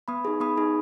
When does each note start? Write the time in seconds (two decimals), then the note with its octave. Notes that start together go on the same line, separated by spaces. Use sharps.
0.08 B3 B5 D#6
0.25 D#4 G#4
0.40 B3 B5 D#6
0.57 D#4 G#4